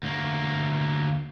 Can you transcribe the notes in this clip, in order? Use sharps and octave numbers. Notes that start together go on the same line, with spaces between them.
D2 A#3